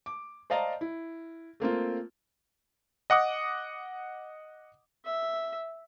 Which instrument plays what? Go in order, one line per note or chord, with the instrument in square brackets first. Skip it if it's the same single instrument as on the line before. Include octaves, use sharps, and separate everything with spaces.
[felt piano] D6
C5 D5 D#5 F5 A5 A#5
E4
A3 A#3 C4 F4
[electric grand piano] D#5 F#5 D6 D#6
[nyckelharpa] E5